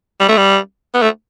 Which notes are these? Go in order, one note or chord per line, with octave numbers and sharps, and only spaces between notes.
G3
A3
G3
B3
A3